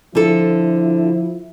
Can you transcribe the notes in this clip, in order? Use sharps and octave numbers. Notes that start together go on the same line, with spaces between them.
D3 F3 E4 A4